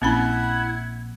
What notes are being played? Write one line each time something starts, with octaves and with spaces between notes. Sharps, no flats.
A#1 C4 C#4 E4 F#5 B5 G#6